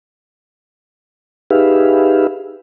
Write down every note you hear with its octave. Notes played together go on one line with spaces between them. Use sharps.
D#4 G4 G#4 B4 E5 F5